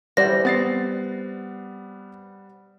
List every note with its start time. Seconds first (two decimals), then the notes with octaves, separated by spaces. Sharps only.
0.17 E3 G3 C5 D5 F#5 A#6
0.45 B3 C4 A6 C7